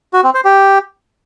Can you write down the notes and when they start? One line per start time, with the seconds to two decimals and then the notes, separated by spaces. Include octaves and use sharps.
0.13 F#4
0.24 C4
0.34 C5
0.45 G4